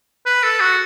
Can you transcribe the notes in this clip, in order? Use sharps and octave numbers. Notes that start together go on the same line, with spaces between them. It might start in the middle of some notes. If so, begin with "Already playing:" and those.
B4
A4
F#4